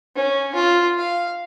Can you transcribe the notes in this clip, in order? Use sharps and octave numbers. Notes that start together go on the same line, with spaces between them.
C#4
F4
F5